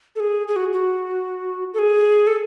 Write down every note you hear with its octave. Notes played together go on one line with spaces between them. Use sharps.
A4
G#4
G#4
F#4
F#4
A4
G#4
A4